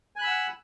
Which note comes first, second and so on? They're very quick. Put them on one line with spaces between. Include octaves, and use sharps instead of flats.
G#5 F#6 B5 E6 F#5